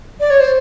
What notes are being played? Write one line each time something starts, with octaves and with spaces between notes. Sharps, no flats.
D5
C#5
C5